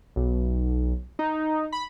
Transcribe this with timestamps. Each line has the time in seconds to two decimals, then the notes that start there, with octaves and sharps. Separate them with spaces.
0.16 B1
1.19 D#4
1.72 B5